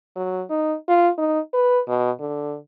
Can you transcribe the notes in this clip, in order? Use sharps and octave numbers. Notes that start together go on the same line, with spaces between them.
F#3
D#4
F4
D#4
B4
B2
D3